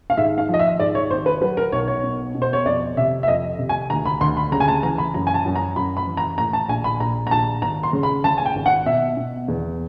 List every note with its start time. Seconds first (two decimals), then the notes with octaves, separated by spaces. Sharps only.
0.10 F5
0.17 G#2 E5
0.38 F5
0.48 F3
0.54 D#5
0.59 E5
0.80 G#2 D5
0.95 C#5
1.11 G#1 C5
1.26 B4
1.41 F#3 B4
1.57 A#4
1.72 B1 C#5
1.88 C#5
2.04 B2
2.35 B2
2.42 C5
2.53 C#5
2.65 F2 D5
2.97 C3 E5
3.23 E5
3.28 F2 D#5
3.59 C3
3.69 G#5
3.90 D2 A#5
4.06 B5
4.21 D2 C6
4.37 B5
4.52 C#3 A#5
4.60 G#5
4.68 A5
4.83 E3 A#5
4.98 B5
5.14 F#2 A#5
5.27 G#5
5.34 A5
5.46 F#2
5.56 A#5
5.76 F#2 B5
5.97 B5
6.07 E3
6.17 A#5
6.38 A2 A#5
6.53 A5
6.69 A#1 G#5
6.84 B5
7.00 A#1 A#5
7.27 A#5
7.31 A#1 A5
7.62 G#1 A#5
7.83 C6
7.93 C#3
8.03 B5
8.24 C#3 A5
8.38 G#5
8.45 G5
8.55 G#1
8.66 F#5
8.86 B2 E5
9.17 B2
9.48 E2